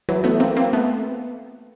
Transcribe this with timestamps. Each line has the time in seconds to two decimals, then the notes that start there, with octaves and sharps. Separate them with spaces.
0.09 E3 F#3
0.24 A3 B3
0.40 A#3 C4
0.57 A#3 C4
0.73 A3 B3